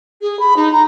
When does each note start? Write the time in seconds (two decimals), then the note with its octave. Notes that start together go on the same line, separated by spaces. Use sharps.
0.21 G#4
0.39 B5
0.56 D#4
0.72 A#5